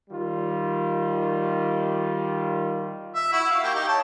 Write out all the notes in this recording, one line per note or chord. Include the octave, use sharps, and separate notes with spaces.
D#3 G3 F4
E5
E4 F#4
F5
A#3 G4
D#4 G4
C#5 A5